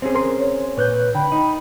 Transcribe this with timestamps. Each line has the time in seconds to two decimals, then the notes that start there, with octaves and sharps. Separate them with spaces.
0.02 C4 C#4 G#4
0.15 A#4 C6
0.40 C#5
0.77 A#2 B4 C#5 F#6 G6
1.15 D3 G5 B5
1.32 D#4